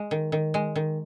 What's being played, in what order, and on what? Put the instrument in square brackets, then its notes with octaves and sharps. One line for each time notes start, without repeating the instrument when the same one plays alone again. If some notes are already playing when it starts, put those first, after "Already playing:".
Already playing: [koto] G#3
D#3
D#3
G#3
D#3